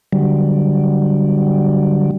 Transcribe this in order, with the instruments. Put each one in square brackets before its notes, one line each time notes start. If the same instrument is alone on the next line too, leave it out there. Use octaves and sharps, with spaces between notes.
[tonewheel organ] D3 F#3 G3